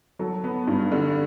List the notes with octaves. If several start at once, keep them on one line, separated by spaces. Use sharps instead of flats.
F#3 A4
B3
G2
D3